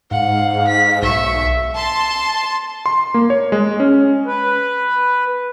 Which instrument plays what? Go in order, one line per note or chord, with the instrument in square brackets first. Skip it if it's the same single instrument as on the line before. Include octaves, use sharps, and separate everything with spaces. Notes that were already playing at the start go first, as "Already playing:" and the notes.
[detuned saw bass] G#2 [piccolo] F5 [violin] F#5
[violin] B6
[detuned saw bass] B1 [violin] E5 C#6
[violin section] A5 C6
[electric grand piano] C6
A#3
C#5
G#3
C#4
[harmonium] B4